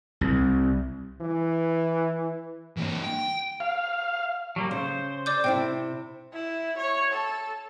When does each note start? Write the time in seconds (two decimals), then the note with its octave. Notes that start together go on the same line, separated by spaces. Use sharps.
0.21 C2
1.21 E3
2.77 E3 A#3
3.04 G5
3.60 F5
4.56 F#3 G3 A#3
4.71 C#3 C5
5.26 D5 D6 G6
5.44 C3 C4 E4 G5
6.33 E4
6.78 C#5
7.12 A4